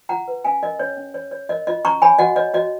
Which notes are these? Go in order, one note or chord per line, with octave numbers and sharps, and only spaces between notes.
F4 F#5 A#5
B4
C#4 F5 G#5
A#4 D#5
C#4 C#5
C#4
C#5
C#5
A#4 D#5
F4 D#5
C#4 A#5 C#6
C#5 G#5 B5
F#4 D#5 F#5
C#5 D#5
F#4 D#5